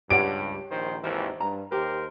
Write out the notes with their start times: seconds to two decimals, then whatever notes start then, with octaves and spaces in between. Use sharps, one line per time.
0.10 C#2 G2 G4 C#5 F#5 D7
0.72 A#1 D#3 C5
1.03 G#1 D#2 E3 A#4 C5 E5
1.40 G2 A#5
1.72 D#2 G4 A#4 C5